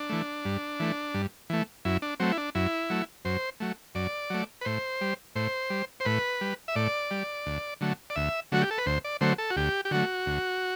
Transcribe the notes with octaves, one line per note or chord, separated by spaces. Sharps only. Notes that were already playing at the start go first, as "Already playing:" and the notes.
Already playing: D4
E3 A3
G2
E3 A3
G2
E3 A3
F#2 E4
D4
F#3 A3 C4
E4
D4
F#2 E4
F#3 A3
F#2 C5
F#3 A3
F#2 D5
F#3 A3
B4
A2 C5
G3
A2 C5
G3
C5
A2 B4
G3
E5
A2 D5
G3
D2
D3 F#3 A3
D5
D2 E5
D3 F#3 A3 F#4
G4
A4
B4
D2 C5
D5
D3 F#3 A3 C5
A4
F#4
D2 G4
G4
D3 F#3 A3 F#4
D2